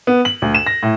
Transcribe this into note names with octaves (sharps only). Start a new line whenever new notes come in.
B3
F#7
D2
E7
A#6
A2